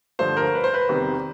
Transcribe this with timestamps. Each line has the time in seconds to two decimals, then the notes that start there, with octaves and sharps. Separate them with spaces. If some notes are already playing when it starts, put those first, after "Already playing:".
0.19 G2 D3 F3 A3 C5
0.37 A#4
0.55 B4
0.64 C5
0.74 B4
0.89 E2 C3 D#3 G3 C4